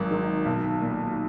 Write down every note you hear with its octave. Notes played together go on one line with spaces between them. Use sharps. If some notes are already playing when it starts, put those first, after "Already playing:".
Already playing: G#1 F#3
G#2 D#3
B1
A#2